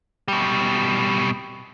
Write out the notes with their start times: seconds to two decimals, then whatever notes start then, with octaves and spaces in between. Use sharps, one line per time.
0.28 B2 G3